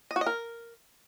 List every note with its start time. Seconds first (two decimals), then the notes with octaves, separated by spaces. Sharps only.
0.11 D#5
0.16 F#4
0.21 D#5
0.26 A#4